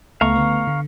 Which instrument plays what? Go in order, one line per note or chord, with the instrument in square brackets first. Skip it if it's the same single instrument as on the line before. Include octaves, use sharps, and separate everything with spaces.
[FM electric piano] C#2 B3 [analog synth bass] A3 [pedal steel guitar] F5 A#5 C#6
[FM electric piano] D3 B3
D3